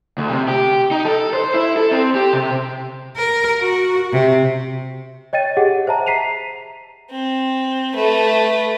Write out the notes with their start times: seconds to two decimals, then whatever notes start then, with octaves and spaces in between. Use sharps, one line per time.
0.18 D2
0.30 C3
0.48 G4
0.91 D#4
1.05 A4
1.33 C5
1.54 E4
1.77 A4
1.91 C4
2.15 G4
2.33 C3
3.17 A#4
3.61 F#4
4.13 C3
5.33 C#5 D#5 G5 A6 D#7
5.57 G4 G#4 F#5
5.87 C5 E5 A5 A#5
6.06 A#5 B6 C7 D#7 F7
7.11 C4
7.94 A3 B4